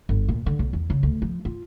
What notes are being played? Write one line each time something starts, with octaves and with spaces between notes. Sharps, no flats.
G1
A#2
D3
B1
E2
C#3
D2
F3
F4